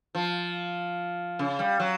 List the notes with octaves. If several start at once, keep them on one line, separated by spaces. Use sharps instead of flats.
F3
C#3
G3
F#3